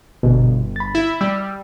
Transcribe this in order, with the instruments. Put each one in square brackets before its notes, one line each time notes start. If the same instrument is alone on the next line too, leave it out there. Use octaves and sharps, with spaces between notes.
[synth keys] G1 [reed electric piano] B2
[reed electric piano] B5 A6
[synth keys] E4
[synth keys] G3 [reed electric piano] E6